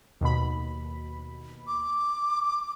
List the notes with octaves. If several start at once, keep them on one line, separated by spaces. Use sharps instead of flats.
D#2 B2 B5
D6